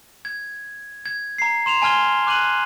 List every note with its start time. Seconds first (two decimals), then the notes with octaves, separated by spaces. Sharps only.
0.25 G#6
1.06 G#6
1.38 A#5 C7
1.66 C6 E7 F7
1.82 G#5 A5 C6 F6 G#6 G7
2.27 D6 F#6 D#7 F#7